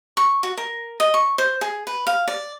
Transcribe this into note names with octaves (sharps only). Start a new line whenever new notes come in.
C#6
F#4
A#4
D#5
C#6
C5
G#4
B4
F5
D5